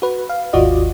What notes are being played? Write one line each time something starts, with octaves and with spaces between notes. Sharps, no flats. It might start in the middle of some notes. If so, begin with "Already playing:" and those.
F#4 B4
F5
G#1 D#2 F4 F#4 D5 D#5